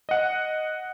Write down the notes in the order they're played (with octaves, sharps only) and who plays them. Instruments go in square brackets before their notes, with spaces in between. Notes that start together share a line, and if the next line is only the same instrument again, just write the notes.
[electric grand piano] D#5 F#5